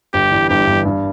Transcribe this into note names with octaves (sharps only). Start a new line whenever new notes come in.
G1 G4
G2 E3
G1 G4
G2 E3
G2